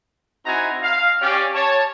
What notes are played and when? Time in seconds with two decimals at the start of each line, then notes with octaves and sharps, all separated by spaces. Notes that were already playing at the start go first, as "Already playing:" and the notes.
0.46 C4 D#4 E4 F#4 G#5 A#5
0.83 F5
1.22 C#4 G4 D5
1.54 C#5 A5